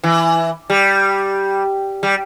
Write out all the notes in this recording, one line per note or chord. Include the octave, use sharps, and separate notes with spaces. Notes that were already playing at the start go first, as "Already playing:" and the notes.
E3
G3
G3